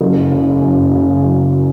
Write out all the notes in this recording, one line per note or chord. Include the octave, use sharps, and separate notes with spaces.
F#1
C#3
F#2
C#3
F#3